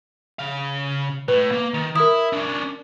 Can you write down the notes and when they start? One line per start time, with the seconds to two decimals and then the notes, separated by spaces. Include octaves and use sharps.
0.39 C#3 F5
1.28 A2 B4
1.52 A#3
1.74 D#3
1.96 E4 A#4 D#6
2.33 C#4 D4